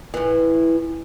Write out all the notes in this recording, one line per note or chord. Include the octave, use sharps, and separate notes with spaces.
A2 E3